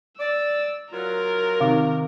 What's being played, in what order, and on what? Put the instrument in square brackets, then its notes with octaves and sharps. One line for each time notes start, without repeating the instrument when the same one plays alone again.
[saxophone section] D5 [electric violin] E6
[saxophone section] F#3 F4 [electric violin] A#4
[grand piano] C3 D#3 [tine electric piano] F5 D6